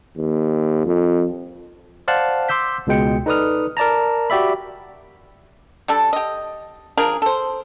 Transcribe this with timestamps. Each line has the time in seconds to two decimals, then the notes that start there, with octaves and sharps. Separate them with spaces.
0.17 D#2
0.86 F2
2.08 C5 D5 F5 F#5 A5 F#6
2.49 C6 D6 E6 G6 B6
2.87 C#2 B2 G#3 G5 C#7
3.26 D#4 A4 B4 D5 D#6 F6
3.77 A#4 D5 A5 A#5
4.30 F#4 G4 D5 E5 B5
5.88 G3 D4 A4
6.13 G4 D#5
6.98 F3 D4 G#4 A#4
7.22 A4 C5